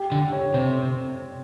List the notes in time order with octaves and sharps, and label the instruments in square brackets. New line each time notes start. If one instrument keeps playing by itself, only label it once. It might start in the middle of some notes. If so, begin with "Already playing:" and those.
Already playing: [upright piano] G4
[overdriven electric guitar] D3 [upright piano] G4
[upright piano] C#5
[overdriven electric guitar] C3 [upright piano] C5